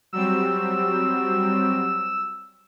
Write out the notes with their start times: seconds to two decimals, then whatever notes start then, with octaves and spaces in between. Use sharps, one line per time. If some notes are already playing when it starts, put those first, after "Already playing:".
0.13 F#3 G3 C4 E6